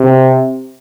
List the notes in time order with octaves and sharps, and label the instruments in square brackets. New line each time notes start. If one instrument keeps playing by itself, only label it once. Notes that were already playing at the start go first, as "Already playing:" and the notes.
Already playing: [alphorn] C3